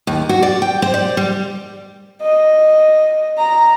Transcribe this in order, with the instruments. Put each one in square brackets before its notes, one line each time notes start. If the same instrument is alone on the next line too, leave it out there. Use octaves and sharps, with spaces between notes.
[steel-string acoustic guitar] D#2
F#4
D5
G5
C5
D5
G3
[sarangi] D#5
A#5